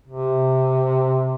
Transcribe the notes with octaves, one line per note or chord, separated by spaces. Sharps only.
C3